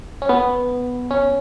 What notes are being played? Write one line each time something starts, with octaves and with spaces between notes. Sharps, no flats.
C#4
B3
C#4